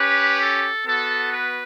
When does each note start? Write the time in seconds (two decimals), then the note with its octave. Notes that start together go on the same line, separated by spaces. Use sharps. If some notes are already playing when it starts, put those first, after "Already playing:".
Already playing: C#4 G4 B4
0.40 A4
0.86 B3 F#4 A4
1.32 B4